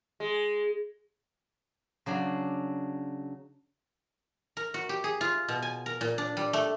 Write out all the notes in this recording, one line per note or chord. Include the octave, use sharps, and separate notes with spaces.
G#3
C#3 F#3 D4
A#4
F#4
G4
G#4
F4
B2
G#5
A#4
A#2
D4
G3
A3